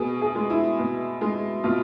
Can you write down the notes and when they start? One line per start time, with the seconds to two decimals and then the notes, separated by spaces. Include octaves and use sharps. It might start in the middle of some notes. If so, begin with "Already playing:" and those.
Already playing: B2 G#4
0.21 G#4
0.35 G#3
0.50 E4
0.79 B2
1.21 G#3
1.64 B2 F4